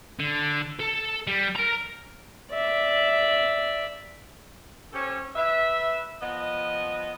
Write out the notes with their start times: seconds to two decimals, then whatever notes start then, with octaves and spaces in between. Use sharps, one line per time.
0.20 D3
0.80 A4
1.27 G3
1.55 A#4 A#5
2.52 D5 E5
4.93 C#4 G4 A4 C5 C#5
5.36 B4 E5
6.22 F3 B3 D#5